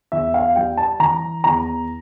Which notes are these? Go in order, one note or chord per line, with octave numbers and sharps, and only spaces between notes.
E2 E5
F5
G3 G5
A5
E3 A#5
E2 A#5